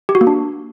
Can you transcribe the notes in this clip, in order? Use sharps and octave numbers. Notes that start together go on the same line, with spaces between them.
G4
F#4
A#3
D4